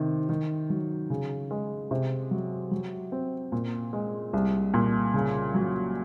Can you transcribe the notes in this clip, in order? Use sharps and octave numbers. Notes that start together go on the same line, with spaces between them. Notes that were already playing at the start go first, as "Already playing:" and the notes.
Already playing: C3 D#3
D#3
F#3
C#3
G#3
C3
F#3
F#3
C4
A#2
G#3
C2
A#2
C#3
F#3